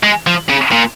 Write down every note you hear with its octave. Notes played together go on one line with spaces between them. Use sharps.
G#3
F3
C#3
A#2